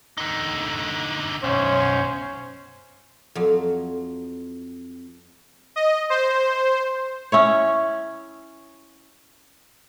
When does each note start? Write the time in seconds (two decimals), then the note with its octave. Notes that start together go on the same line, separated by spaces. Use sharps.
0.18 D3 D#4
1.44 B1 F#2 C#4 C5 C#5
3.35 F2 F#3
5.76 D#5
6.10 C5
7.32 C#4 E4 C#5